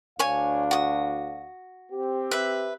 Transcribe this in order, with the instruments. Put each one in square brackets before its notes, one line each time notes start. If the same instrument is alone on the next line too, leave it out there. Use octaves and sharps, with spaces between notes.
[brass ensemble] D2 D4 F5 [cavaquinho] C#5 G#5
[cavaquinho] F#4 D#6
[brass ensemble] C4 G4
[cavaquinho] B4 E5